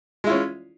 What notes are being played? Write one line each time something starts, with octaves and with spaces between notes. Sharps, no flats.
G#3 C#4 E4 F4